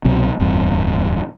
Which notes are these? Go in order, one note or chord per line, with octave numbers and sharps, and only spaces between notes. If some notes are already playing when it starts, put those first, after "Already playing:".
C2 B2 F#3 C4
D1 E2 G2 C4